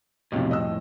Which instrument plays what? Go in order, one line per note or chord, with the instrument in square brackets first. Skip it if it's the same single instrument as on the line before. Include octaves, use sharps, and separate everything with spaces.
[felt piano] B1 C3 [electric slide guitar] F2 A2
[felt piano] D#5 E6